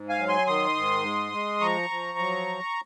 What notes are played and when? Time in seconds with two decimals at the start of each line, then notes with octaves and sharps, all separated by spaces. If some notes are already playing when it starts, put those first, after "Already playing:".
Already playing: G#2
0.09 F5 G#5
0.19 F#3
0.28 G#5 C6
0.47 D#3 C6 D#6
0.76 G#2
1.04 G#3
1.33 G#3
1.61 F3 A#5 C#6
1.90 F3
2.18 F#3